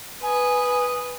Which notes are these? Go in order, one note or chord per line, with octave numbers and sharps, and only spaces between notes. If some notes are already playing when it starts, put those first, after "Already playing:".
B4 G#5 D#6